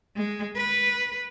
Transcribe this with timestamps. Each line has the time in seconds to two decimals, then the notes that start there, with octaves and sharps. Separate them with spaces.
0.17 G#3
0.57 B4